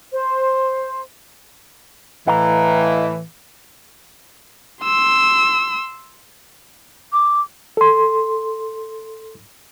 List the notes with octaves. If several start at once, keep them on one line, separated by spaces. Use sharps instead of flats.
C5
A2 E3 D#5 F5 A#5
C6 E6
D6
A4 C6